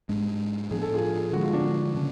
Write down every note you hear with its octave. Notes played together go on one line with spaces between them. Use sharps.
G#2 G#3 D4
A2 F3 B3 D4 G#4
A4
F4 G#4
D3 F3 G#3 F#4
F4
D4 F#4
C#3 F#3 C#4